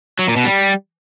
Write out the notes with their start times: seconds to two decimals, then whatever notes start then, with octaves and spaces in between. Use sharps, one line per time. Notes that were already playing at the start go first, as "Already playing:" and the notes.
0.19 F#3
0.28 A#2
0.36 B2
0.45 G3